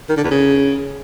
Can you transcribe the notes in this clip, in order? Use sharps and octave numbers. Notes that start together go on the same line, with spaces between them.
D#3
D3
E2
C#3